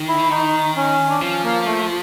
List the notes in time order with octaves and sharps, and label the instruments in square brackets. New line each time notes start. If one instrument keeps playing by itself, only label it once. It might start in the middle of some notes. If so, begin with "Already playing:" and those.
Already playing: [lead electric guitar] D#3
[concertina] E4
D#4
C#4
D4
[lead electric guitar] F3 [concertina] C#4
[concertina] A#3
A3